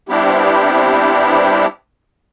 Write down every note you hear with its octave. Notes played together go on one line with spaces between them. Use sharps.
G3 B3 C4 D4 E4 G4